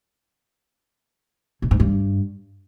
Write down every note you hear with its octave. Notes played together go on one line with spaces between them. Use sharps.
B2
G#2
G2